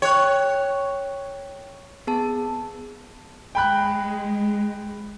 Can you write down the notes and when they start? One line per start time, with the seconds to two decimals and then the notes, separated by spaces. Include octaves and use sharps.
0.02 C#5 G5 F#6
2.07 B3 G#4 A5
3.55 G#3 G5 B5 F#6